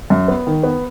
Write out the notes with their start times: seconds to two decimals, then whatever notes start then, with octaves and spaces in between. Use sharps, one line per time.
0.10 F#2
0.28 B3
0.47 D#3
0.63 B3